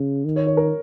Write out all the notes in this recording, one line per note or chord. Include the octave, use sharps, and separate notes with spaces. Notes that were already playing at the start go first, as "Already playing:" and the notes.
Already playing: C#3
D#3
C#5
C#5
A#4